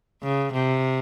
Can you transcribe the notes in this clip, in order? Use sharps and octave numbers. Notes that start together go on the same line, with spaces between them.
C#3
C3